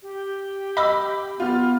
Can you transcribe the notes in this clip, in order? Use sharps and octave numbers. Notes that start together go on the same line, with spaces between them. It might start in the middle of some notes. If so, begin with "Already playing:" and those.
G4
D#5 B5 D6 E6
B3 F4 F6